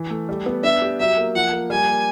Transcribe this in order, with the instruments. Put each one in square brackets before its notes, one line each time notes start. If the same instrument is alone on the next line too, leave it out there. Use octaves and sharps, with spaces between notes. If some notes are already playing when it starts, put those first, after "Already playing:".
Already playing: [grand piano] E3
A3
G3
B3
[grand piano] D4 [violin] E5
[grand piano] G4
[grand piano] F#3 [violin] E5
[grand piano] A#3
[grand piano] F3 [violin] F#5
[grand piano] A#3
[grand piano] G3 [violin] G#5
[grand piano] A#3